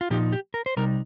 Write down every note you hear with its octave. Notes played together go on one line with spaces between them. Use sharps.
F4
A#2 F3 D#4 G4
G4
A#4
C5
C3 G3 D#4 A#4